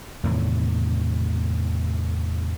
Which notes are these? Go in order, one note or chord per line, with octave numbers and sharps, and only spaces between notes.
E2 A2 C3 D#3